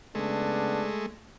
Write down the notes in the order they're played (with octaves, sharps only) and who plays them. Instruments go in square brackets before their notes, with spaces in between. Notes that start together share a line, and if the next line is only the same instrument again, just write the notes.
[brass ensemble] C#3 B3 D4 [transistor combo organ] G#3 A3